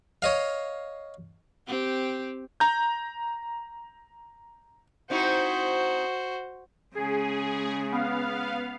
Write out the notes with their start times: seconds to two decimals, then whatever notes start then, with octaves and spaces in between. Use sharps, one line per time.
0.22 C#5 D#5 F5
1.67 C4 G4
2.60 A#5 G6
5.10 C4 D#4 E4 F#4 C5
6.95 C#3 G#3 G#4
7.92 B3 F5